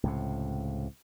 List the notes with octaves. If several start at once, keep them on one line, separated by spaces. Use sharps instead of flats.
C#2 A2 C3